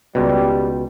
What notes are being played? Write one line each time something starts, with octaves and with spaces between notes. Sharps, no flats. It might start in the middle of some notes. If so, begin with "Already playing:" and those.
C#2 B2 G3